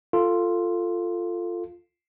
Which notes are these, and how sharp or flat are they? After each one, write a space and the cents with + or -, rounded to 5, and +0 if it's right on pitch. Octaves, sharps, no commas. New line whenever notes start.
F4 +0 A4 +15